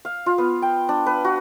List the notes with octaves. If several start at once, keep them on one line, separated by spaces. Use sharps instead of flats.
F5
F4
B3
G5
D4
B4
F#4